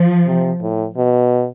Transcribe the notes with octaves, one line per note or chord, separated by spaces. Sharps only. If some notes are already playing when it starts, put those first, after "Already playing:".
Already playing: F3
C3
A2
B2